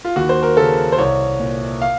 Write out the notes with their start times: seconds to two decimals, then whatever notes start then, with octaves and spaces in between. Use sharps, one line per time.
0.05 F4
0.16 D#2 F#4
0.29 C5
0.43 A#4
0.57 C#3 A4
0.92 C5
0.98 C2 C#5
1.40 A#2
1.81 F5